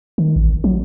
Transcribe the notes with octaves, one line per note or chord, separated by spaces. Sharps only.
D#3
A1
F#3